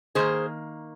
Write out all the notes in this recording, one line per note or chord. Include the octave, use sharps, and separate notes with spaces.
D#3 A#3 G#4 C5